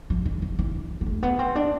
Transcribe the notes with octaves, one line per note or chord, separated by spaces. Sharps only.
F3
E3
E3
E3
B3
A3
B3
C4
D4